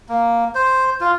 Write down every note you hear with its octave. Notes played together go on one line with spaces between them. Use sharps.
A#3
C5
F4